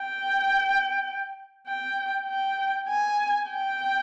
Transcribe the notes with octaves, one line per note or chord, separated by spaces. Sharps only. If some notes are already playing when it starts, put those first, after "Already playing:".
Already playing: G5
G5
G5
G#5
G5